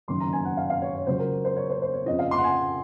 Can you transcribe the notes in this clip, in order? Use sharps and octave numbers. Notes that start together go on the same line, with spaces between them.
F#1 F#2 D#3 F#3 C6
A#5
G#5
F#5
F5
F5
C#5
C#5
C#2 C#3 F#3 C5
A#4
C5
C#5
C5
C5
C#5
F2 C#3 F3 D#5
F5
C6
F#5
G#5